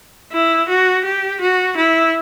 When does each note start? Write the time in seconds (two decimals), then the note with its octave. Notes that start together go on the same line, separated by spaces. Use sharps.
0.32 E4
0.69 F#4
1.04 G4
1.40 F#4
1.77 E4